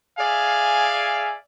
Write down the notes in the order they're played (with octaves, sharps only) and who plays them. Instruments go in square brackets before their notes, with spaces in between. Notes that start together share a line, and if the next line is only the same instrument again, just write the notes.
[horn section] G#4 D5 E5 F5 G#5